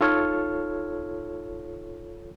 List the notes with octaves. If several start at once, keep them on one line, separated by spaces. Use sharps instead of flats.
D#4 F4 A4 C#5 F6